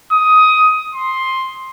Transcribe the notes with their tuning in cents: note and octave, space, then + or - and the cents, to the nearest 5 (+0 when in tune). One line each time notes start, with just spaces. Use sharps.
D#6 +15
C6 +10